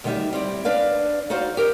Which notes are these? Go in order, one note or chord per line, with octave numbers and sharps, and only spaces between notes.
D2 D#3 G3 D#4 E5
G3 C4 E4
D4 B4 D5 F5
D#4 F#4 C5 D5 F5
G4 A#4 C5 D#5